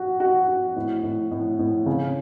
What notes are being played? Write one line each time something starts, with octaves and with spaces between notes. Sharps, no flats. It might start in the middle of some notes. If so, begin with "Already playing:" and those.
Already playing: F#4
F#4
F#4
A2
A2
A2
A2
C#3